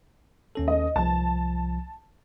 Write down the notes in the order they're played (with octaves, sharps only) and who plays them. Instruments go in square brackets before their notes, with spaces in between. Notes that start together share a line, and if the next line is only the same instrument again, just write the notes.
[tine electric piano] D#2 C#4 A4
[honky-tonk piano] D#5
[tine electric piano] C2 F3 [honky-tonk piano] A5